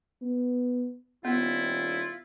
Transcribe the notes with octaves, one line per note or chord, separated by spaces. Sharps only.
B3
D#1 B3 E4 F4